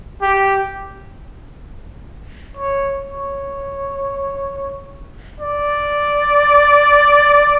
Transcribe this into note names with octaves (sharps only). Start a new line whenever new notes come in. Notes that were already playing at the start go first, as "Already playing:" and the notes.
G4
C#5
C#5
D5